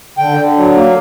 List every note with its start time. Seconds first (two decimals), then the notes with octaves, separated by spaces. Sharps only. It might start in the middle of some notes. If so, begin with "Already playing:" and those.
0.18 D3 G5
0.37 D3
0.56 F#3
0.75 A#3